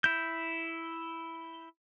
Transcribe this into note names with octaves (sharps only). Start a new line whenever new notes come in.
E4 G6